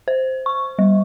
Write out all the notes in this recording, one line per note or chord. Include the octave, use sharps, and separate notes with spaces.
C5
C#6
G3